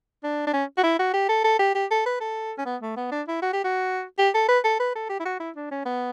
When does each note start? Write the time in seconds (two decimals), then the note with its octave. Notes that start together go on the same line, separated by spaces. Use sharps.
0.23 D4
0.47 D4
0.53 C#4
0.77 F#4
0.83 E4
0.99 F#4
1.13 G4
1.29 A4
1.44 A4
1.59 G4
1.75 G4
1.91 A4
2.06 B4
2.20 A4
2.58 C#4
2.66 B3
2.82 A3
2.97 B3
3.12 D4
3.28 E4
3.42 F#4
3.53 G4
3.64 F#4
4.18 G4
4.34 A4
4.48 B4
4.64 A4
4.80 B4
4.95 A4
5.09 G4
5.20 E4
5.25 F#4
5.40 E4
5.56 D4
5.71 C#4
5.85 B3